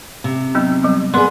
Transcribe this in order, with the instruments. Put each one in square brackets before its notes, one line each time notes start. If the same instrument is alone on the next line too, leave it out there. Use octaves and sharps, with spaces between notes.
[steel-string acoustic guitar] C3
[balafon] F#3 B3 D#4
F#3 G3
[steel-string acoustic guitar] B3 G#4 [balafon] A#4 D5 C6